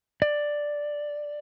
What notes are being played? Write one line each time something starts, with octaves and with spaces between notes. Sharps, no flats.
D5